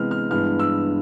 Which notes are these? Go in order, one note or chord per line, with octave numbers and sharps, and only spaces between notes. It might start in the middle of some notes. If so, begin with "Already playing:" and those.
Already playing: C3 E3 G#3 B3 F6
F6
G2 E3 G#3 B3 F6
E6